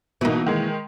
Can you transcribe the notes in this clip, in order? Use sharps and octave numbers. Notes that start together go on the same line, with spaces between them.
B2 E3 A#3 D#4
D#3 G#3